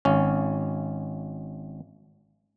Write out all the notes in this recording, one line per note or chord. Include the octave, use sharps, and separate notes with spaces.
G#1 C#4